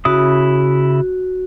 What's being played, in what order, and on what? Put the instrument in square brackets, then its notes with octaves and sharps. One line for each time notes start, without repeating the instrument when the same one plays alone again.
[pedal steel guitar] C#3 E4 D#6 [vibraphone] F#4